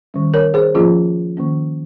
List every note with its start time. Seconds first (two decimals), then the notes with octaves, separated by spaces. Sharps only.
0.14 D#3 G3 C#4
0.34 A#4 C#5
0.54 G#4 C5
0.75 F3 A#3 C#4 F4 G#4
1.37 D#3 A#3 C#4